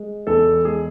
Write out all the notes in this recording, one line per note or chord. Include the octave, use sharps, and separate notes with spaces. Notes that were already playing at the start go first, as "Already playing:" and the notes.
Already playing: G#3
E2 A4
G#3 G#4